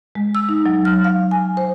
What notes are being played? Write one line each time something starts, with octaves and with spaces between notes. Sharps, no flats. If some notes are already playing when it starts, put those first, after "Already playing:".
G#3
E6
D#4
F#3
F6
F5
G#5
C5